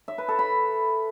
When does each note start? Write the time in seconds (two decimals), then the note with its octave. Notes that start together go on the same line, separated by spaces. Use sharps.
0.08 E5
0.18 B4
0.28 A4
0.39 B5